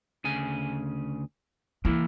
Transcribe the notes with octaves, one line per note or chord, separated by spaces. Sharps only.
D2 C#3 G#5
E3 A#3 E4